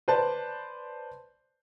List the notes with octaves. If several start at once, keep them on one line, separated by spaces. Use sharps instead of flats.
B4 C5 D5 A5